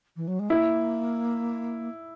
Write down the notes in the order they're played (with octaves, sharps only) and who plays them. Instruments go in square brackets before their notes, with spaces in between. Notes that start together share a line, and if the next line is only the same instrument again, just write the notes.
[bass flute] E3
F#3
G#3
[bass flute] A#3 [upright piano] E4